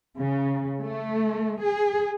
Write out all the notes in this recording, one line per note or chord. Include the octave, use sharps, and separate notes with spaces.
C#3
A3
G#4